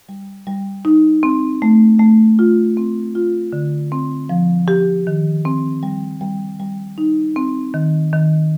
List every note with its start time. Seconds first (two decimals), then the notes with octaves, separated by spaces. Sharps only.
0.09 G3
0.47 G3
0.85 D#4
1.23 C4
1.62 A3
1.99 A3
2.39 F4
2.77 C4
3.15 F4
3.53 D3
3.92 C4
4.29 F3
4.68 G4
5.07 D#3
5.45 C4
5.83 G3
6.21 G3
6.60 G3
6.98 D#4
7.36 C4
7.74 D#3
8.13 D#3